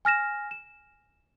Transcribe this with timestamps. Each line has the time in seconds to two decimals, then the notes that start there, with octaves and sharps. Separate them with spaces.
0.05 G#5 F6 A#6 E7
0.51 E7